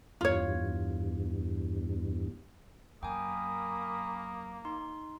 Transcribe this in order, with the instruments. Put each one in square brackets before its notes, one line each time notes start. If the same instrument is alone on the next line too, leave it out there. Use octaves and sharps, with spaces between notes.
[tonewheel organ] E2 G2 [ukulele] F4 C#5
[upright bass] F#2 [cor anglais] A#3 [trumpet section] A#4 B5 D#6 [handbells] G5 G#5
[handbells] D#4 C6